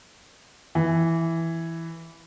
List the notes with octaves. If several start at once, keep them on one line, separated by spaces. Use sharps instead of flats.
E3